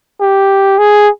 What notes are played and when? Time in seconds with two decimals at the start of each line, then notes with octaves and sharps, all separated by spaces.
0.20 G4
0.78 G#4